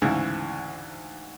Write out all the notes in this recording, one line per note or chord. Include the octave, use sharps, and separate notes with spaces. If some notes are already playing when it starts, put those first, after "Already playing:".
D2 G#2 C#3 E3